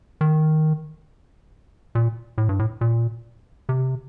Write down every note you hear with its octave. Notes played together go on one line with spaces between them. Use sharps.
D#3
A#2
A2
G2
A2
A#2
C3